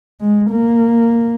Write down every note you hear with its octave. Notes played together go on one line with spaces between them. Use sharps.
G#3
A#3